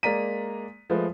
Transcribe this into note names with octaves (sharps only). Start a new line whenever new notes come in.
G#3 A#3 D5 A#5 B6 D#7
F3 G#3 A3 B4 C5